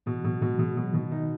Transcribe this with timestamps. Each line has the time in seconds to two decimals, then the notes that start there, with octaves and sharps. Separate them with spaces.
0.06 B2 E3
0.24 B2 F#3
0.41 B2 G#3
0.59 B2 G#3
0.77 B2 F#3
0.93 B2 D#3
1.11 D#3 D#4